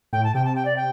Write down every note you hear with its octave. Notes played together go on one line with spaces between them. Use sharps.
A2 G5
A5
C3 G5
A5
G5
D5
G5